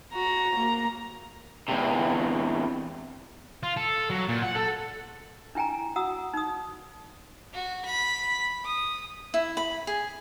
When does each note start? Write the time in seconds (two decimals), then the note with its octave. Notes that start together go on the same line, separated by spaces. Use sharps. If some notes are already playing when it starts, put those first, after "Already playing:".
0.14 F#4 A#5
0.56 A#3
1.69 E2 C3
3.63 F4
3.77 A4
4.10 F#3
4.29 A#2
4.42 F#5
4.55 A4
5.55 D4 E4 G5 G#5 A#5
5.96 F#4 F#5 A#5 D#6 E6
6.34 D#4 D#6
7.54 F#4
7.85 B5
8.65 D#6
9.34 E4
9.57 B5
9.87 G#4